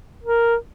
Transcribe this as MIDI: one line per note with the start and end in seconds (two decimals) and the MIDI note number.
0.24 0.56 70